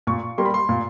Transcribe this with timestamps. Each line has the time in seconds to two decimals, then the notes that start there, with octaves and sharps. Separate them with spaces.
0.07 A#2 C#6
0.38 G3 A#3 C6
0.46 B5
0.54 C6
0.69 A#2